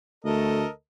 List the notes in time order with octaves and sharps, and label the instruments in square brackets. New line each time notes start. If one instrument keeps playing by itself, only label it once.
[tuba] D2 [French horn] A3 [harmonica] A4 A#4 D#5